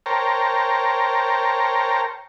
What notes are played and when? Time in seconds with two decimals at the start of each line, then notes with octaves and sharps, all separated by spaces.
0.06 A#4 C5 C#5 G5 A5 A#5